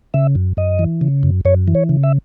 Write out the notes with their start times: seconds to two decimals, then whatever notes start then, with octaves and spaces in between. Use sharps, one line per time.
0.14 C#3 E5
0.35 F#2
0.57 F#2 D#5
0.79 E3
1.01 C#3
1.23 F#2
1.45 F#2 C#5
1.68 E3
1.75 C#5
1.89 C#3
2.03 E5